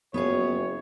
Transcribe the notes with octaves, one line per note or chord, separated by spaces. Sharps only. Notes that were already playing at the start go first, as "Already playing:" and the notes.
F#1 B3 F4 G#4 C#5